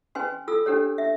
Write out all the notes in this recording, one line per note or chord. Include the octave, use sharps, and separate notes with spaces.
C#4 B4 G#5 C6
F4 A4 E6
C#4 D4 G4 A4 C#5
E5